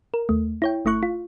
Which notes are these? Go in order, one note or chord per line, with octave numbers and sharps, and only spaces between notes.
A#4
D#2 A3
E4 C#5 G5
G1 A3 E4 C#6 F#6
F4